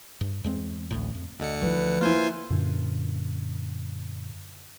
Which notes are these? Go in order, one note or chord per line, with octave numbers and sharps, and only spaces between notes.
G2
E2 G#3 C4
A1 D2 A2
F2
D2 D3 D#5 C#7
E3 F3 B4
A#3 E4 F4 C5 G#5
F#2 A#2 D3